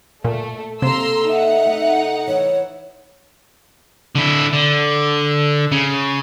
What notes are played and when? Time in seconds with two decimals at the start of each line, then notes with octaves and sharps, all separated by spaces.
0.24 A#2 A3
0.82 C3 A#3 A4 A#5 C6 E6
1.29 D#4 E5 F#5
1.66 A3
2.27 E3 E4 C#5
4.15 D3 E4
4.53 D3
5.72 C#3